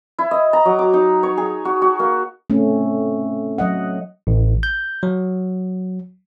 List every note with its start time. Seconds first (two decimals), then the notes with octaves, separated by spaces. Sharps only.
0.19 E4
0.31 D#5
0.53 A#5
0.65 F#3
0.79 D6
0.93 D#4
1.23 C#5
1.37 G#4
1.65 F#4
1.82 F#4
1.99 A#3
2.50 A3 C4 C#4
3.58 F#3 D#5 F#5
4.27 A1
4.63 G6
5.03 F#3